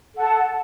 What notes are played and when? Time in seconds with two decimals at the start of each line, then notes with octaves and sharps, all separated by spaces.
0.15 A4
0.18 F#5
0.20 A5